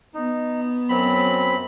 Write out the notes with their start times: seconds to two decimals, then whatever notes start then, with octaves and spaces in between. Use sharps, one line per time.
0.14 B3 D#4
0.90 F#2 F#3 C4 B5